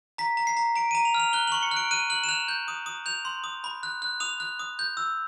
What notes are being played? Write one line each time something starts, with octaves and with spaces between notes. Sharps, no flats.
A#5 B6
A#5
C7
A#5
A#5 D7
A#5 D#7
F7
F6
F7
F#6 G7
C#6 F#7
C#7
F#6
D7
F#6 D#7
F#6 F#7
E7
F#6 F7
G6
D#6
D#6
G6 F7
C6
D#6
B5
F#6
F#6
D#6 F7
F#6
D#6
G6
E6